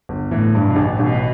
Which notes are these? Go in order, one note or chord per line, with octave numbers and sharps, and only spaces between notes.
G1
A2 E3
G2
B2
A1
A1 B2